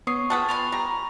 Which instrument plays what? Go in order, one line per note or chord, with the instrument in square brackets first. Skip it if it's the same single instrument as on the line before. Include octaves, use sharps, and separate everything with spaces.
[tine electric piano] B3 D#6 C7 [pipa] C#5 [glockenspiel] C#6
[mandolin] F4 G#4 E6 [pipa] B4 F#5 A5 [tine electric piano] G5
[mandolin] F4 D5 G#5 [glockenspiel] B5 F7
[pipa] G3 [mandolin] A#5